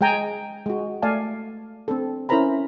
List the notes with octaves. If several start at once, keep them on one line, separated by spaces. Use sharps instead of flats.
G#3 G#4 G5 G#5 A#5
G#3 F#4
A3 D5 F5 G#5 A5
C4 D4 A4
C#4 E4 A#4 C5 A#5 B5